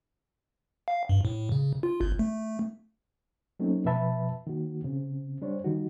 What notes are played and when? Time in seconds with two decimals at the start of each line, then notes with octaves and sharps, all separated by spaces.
0.88 F5
1.09 G2
1.25 A2
1.52 C#3
1.83 F4
2.01 G1
2.19 A3
3.59 F#3 A3 A#3 C4 C#4 D#4
3.85 B2 F3 B4 E5 A5 B5
4.47 D#3 A#3 F#4
4.84 C#3 C4
5.41 G3 D4 C5 C#5
5.64 D3 D#3 G3 D#4 F#4